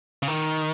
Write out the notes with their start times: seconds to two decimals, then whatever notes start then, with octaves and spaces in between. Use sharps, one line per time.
0.23 C#3
0.28 D#3